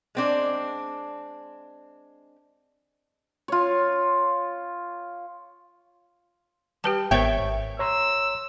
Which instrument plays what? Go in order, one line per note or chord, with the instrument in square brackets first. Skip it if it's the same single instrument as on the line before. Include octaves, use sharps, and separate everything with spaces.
[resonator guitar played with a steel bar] G#3 C4 D4
[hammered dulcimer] F4 C#5
[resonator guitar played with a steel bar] G3 [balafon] G4 B4 A5
[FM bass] G#1 [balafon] B3 A#4 C5 [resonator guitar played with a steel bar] C#5 E5 G5
[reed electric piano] C#5 A#5 C6 [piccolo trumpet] E6